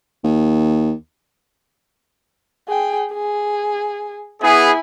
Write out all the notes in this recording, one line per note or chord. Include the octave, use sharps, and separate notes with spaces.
D#2
G#4 G5
G#4
B3 E4 G#4 G#5